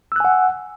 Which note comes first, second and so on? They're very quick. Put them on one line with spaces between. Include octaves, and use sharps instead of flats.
E6 F#6 G#5 F#5